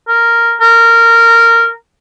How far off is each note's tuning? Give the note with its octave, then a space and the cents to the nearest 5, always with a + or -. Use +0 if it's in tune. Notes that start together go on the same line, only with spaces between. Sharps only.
A#4 -5
A#4 -15